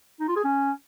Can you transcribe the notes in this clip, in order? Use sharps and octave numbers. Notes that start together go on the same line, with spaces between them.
D#4
F4
G#4
C#4